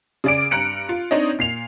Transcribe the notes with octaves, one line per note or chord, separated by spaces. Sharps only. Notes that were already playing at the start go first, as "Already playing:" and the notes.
C#3 G#4 D5 D6 D7
G2 A#5 F#6 C#7 D7
F4
C4 D4 D#4 C#5 D#5
A#2 C7 F7